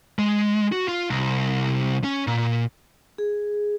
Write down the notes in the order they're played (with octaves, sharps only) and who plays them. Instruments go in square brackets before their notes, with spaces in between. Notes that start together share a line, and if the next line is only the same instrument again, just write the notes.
[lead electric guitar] G#3
F#4
F4
C2
C#4
A#2
[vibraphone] G#4